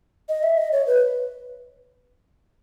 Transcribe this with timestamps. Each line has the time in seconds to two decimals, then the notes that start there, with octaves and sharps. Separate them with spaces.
0.29 D#5
0.43 E5
0.58 D#5
0.72 C#5
0.87 B4